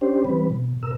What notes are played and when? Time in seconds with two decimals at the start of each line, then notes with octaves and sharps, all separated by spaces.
0.01 C#4 D4 G4 C5
0.24 E3 G3 C4 B4
0.50 B2
0.83 B2 A#4 E6